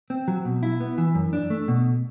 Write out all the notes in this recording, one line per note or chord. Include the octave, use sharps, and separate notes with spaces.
C4
F#3
B2
E4
B3
E3
F#2
D4
A3
B2